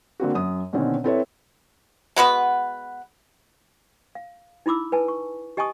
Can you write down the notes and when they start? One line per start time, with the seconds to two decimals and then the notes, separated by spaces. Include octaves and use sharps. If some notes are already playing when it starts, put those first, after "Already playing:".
0.20 D3 A#3 C4 F#4
0.35 F#2 D#6
0.73 B2 D3 D#3 C4 C#4
1.04 C4 E4 A4 B4 C#5 E5
2.16 G#3 B3 F#4 B4
4.15 F5
4.66 D#4 E4 B5 D6 E6
4.92 B4 G#5 A5
5.08 C#6
5.57 G4 D#5 G#5 A5 C#6 D#6